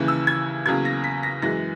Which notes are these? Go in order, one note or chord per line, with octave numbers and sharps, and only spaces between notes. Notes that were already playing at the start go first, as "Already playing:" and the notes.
Already playing: D#2 C#3 E3
E6
G#6
E2 C#3 F#3 A#3 G#6
A#6
B6
A#6
F#2 E3 G#3 A#6